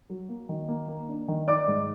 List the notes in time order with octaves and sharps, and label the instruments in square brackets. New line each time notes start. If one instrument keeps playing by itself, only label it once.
[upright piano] F#3
A#3
D#3
A#3
A#3
D4
D#3
D#4 D5 D6
G#2